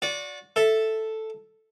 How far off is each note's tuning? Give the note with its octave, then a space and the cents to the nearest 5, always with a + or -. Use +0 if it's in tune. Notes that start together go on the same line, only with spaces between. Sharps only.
F#4 -30 D5 -15
A4 +0 E5 +0